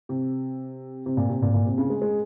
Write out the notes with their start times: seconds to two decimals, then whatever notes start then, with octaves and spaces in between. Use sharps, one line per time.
0.09 C3
1.06 C3
1.17 A#2
1.29 C3
1.42 A#2
1.54 A#2
1.66 C3
1.78 C#3
1.90 G#3
2.02 G#3